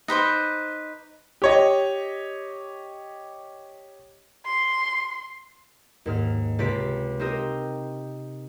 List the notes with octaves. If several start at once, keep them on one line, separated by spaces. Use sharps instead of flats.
D#4 B4 C5 D6
G4 C#5 D#5
C6
D#2 G#2 F6
C#2 C3 A6 B6 D7
C4 D#4 G4 A#4 C5 D#5